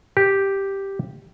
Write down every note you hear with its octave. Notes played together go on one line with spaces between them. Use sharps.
G4